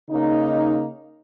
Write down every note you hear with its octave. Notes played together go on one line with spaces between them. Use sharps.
C#3 A#3 D#4